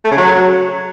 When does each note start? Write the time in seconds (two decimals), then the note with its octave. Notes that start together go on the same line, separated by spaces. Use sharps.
0.05 A3
0.11 C#3
0.18 F#3